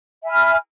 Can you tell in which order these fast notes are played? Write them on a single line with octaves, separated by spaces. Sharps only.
E5 G#5 B5 F6